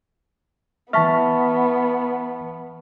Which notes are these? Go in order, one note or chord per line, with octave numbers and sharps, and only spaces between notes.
E3 B3 E5 A5 C#6 F6 B6